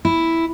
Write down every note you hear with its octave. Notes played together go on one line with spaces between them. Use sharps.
E4